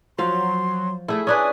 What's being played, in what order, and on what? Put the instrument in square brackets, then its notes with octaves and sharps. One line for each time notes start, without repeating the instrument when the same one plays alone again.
[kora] F3 F5 [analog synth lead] F#3 [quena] C6
[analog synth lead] A3 [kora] E4 G#4
[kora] C#4 D4 B4 [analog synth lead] G#5 [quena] D#6